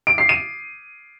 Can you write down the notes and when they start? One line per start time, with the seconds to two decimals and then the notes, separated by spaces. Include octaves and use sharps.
0.07 D7
0.18 C7
0.29 D#7